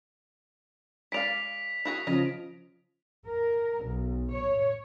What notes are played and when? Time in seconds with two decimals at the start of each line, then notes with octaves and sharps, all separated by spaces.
1.12 G#3 D5 F5 B6 D7 F7
1.85 E4 F#4 G#4
2.07 C#3 F3 D#5
3.27 A#4
3.86 B1
4.33 C#5